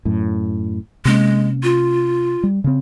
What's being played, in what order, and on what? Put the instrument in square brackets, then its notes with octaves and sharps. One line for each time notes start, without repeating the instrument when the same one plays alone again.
[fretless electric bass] F#2 A2
[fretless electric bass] C3 A#3 C#4 [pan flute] G#3
[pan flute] F4
[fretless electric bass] G3
C#3 C4